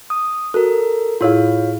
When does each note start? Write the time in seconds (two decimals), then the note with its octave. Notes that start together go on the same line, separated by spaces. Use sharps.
0.10 D#6
0.54 F#4 A4 A#4
1.21 A2 E4 F4 G#4 C#5 F5